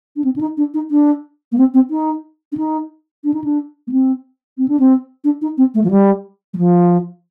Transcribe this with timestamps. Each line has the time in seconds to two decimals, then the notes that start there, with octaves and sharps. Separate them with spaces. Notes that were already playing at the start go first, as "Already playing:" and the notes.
0.16 D4
0.24 C4
0.36 D4
0.41 D#4
0.57 D4
0.74 D#4
0.91 D4
1.52 A#3
1.58 C4
1.74 C4
1.90 D#4
2.52 D4
2.57 D#4
3.24 D4
3.34 D#4
3.44 D4
3.87 A#3
3.92 C4
4.58 C4
4.68 D4
4.80 C4
5.24 D4
5.42 D#4
5.58 C4
5.75 A3
5.84 F3
5.91 G3
6.54 G3
6.57 F3